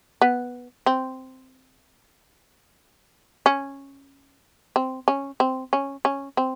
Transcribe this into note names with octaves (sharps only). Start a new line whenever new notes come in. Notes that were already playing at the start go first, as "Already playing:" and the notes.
B3
C4
C#4
C4
C#4
C4
C#4
C#4
C4